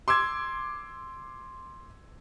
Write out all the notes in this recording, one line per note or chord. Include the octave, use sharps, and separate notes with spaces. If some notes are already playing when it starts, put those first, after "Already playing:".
C6 D6 E6 G#6